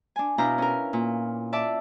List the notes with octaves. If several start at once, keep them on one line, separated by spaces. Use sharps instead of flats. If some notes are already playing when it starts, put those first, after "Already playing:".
D4 G#5
B2 D4 E4 F5 A#5 G6
C#4 A#4
A#2
D5 E5 A5 D6